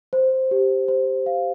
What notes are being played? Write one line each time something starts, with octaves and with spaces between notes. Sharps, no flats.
C5
G4
C5
F5